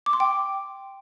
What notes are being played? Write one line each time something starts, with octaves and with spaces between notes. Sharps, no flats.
D6
C6
G5